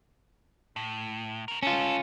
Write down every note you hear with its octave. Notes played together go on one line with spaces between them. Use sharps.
A2
C#3 A#4
A2 C#4 F4 A4